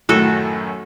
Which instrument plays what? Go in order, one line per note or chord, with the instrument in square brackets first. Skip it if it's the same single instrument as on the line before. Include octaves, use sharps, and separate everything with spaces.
[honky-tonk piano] F#2 A2 D#3 [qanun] F#4 A4